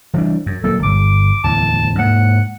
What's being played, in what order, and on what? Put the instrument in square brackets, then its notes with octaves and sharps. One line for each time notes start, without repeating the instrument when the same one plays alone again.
[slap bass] E3 G3 D4
F#2
[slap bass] D#1 F#3 A#3 [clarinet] A4
[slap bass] G1 [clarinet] D6
[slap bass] D1 E2 [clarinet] A5
[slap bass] G#2 A#3 [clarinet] F#5